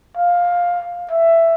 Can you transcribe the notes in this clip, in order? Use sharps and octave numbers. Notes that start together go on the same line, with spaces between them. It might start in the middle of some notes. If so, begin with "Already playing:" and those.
F5
E5